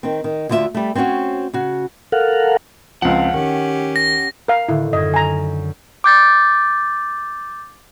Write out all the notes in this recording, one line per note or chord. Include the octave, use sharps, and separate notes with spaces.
D#3 C4
D#3
D2 D3 F4 G4 E5
G3 A3
C4 C#4 F4 F#4 C#5
C#3 F#4
A4 A#4 F5 F#5
C#2 F3 C4 F#5
D#3 C#4 G4
A#6
A#4 F5
A2 D3 D#3 E4
F#2 D#5 G#6
G#5 A#5
D6 G6 A6